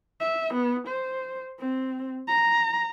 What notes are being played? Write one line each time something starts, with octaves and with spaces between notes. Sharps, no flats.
E5
B3
C5
C4
A#5